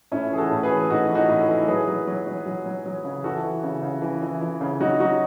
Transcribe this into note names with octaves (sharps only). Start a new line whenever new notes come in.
A2 C#4 E4
E3 G#4
F#4 A4
A2
G#4 B4
E3
A2 D#4 F#4
E3
D#4 F#4
A2
E3
F#3 G#4 B4
F#3
F#3
F#3
F#3
F#3
F#3
C#3
E3 F#4 A4
E3
C#3
C#3
E3
E3
E3
C#3
F#3 D#4 F#4
F#3 D#4 F#4